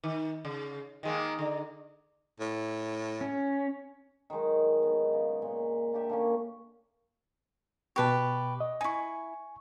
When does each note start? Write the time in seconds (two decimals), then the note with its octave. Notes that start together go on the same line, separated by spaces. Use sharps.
0.04 D#3
0.45 C#3
1.03 D#3 G#3 A#3
1.39 D3
2.40 A2
3.21 C#4
4.30 D#3 F#3 G#3 D#4
4.83 B3 D#4
5.13 C#3
5.42 A#2
5.93 A#3 D4 G4 E5
6.09 D3 A#3 C#4
7.96 B2 G4 B4 A5 C#6
8.61 D#5
8.81 D#4 E4 G#5 C#6